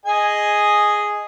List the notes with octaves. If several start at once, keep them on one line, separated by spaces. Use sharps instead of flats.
G#4 D#5 G#5